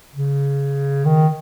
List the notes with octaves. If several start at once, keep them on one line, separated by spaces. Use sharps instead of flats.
C#3
D#3